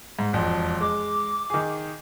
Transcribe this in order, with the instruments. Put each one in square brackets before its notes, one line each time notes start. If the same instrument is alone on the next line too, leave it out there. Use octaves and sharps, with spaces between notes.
[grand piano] G#2
E1 F2
[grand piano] G#3 [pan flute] D6
[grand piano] D#3 G#4